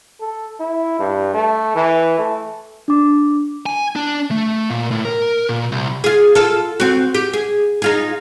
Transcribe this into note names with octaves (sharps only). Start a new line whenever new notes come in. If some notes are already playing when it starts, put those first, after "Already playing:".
A4
E4
G2
A3
E3
A3
D4 D6
G#5
D4
A3
A#2
A2
A#4
A#2
C2
F4 G#4
F4 A4
C4 F#4
G4
G#4
D#4 F4 G#4